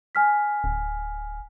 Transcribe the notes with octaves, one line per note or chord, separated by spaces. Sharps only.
G#5 F6 B6
D1